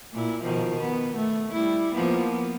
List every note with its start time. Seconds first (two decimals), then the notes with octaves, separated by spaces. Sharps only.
0.13 A#2 E4
0.42 B2 D#3 F3
0.79 B3
1.17 A3
1.53 G3 E4
1.94 F3 A#3 B3